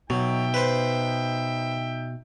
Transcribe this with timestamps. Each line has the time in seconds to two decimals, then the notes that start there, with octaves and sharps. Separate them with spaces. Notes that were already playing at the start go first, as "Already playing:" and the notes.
0.10 B2 F#3 D#4 E5 G5
0.54 B4 C5